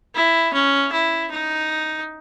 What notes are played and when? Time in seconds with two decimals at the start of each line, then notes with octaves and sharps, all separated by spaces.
0.15 E4
0.53 C#4
0.92 E4
1.31 D#4